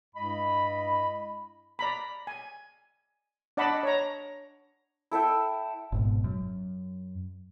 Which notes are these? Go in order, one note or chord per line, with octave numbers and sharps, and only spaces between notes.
G2 G#3 E4 D#5 B5
D5 A#5 B5
G#5
D4 D5 D#5 F#5 A5 B5
C#5 A#5
E4 A4 E5 G5
G#1 G#2 B2
F#2